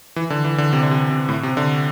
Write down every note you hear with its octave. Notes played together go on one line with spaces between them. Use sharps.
E3
D3
E3
D3
C3
D3
C3
C3
A2
C3
D3